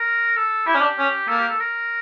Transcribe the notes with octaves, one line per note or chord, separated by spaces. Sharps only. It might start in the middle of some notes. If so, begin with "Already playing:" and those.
Already playing: A#4
A4
E4 G4
C#4
D4
C#4
A#3 A4
G4
A4
A#4